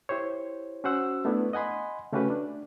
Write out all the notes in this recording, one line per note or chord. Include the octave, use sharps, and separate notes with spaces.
E4 G4 C5 C#5
C#4 F#4 C5 F#5 E6
A3 B3 D4 E4
D#5 F#5 G#5 B5 C6
C#3 A3 C#4 F#4 G4 B4
D4